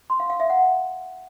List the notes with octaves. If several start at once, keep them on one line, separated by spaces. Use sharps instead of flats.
C6
F5
F5
E5
F#5